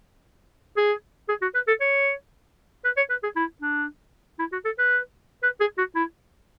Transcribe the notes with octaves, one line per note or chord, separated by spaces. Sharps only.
G#4
G#4
F#4
B4
A4
C#5
B4
C#5
B4
G#4
E4
D4
E4
F#4
A4
B4
B4
G#4
F#4
E4